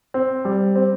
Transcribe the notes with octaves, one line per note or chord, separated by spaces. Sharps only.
C4
G3
C4